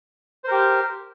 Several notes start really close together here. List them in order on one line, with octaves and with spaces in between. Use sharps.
C5 A#4 G4